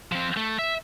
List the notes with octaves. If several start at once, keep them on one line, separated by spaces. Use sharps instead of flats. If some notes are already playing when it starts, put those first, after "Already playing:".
F3 C4
A3
E5